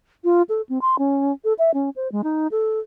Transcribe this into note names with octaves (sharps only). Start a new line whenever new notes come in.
F4
A4
C4
C6
C#4
A4
E5
C#4
C5
G#3
D#4
A4